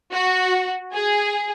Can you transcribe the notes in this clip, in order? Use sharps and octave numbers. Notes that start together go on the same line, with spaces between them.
F#4
G#4